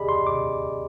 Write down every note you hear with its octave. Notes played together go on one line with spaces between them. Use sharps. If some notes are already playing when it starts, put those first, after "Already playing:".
Already playing: G4 G#4 D5 D#5 B5
C6
D6